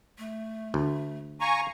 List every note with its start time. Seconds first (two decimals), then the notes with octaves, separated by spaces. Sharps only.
0.18 A3
0.74 D2
1.41 F5 G#5 A#5 C#6